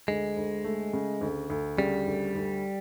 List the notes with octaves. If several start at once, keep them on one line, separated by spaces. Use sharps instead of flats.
D2 G#3
D2
A3
C#3
D2
D2
C#3 G3
D2
D2